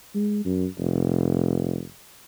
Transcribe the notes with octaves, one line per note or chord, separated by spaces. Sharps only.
G#3
F#2
F1